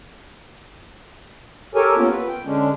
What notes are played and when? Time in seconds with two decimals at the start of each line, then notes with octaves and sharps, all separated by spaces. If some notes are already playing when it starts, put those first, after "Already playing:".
1.75 G4 A4 A#4 C#5 G#5
1.97 A#3 B3 C#4 F4
2.10 B4
2.28 G5
2.45 D3 G#3 C#4 D4